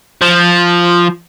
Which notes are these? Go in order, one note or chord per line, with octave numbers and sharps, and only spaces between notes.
F3